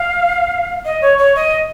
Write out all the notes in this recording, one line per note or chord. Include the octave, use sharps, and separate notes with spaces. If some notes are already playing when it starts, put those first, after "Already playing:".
Already playing: F5
D#5
C#5
C#5
D#5